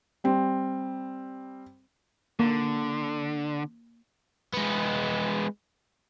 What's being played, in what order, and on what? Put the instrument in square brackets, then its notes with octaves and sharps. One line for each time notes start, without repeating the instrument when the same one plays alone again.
[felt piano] G3 C4
[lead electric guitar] D3 [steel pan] A#3
[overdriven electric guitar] G#3 B3